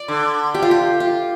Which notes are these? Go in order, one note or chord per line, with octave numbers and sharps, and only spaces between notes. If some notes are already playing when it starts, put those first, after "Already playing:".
Already playing: D5
D3
G4
F4
G4
F4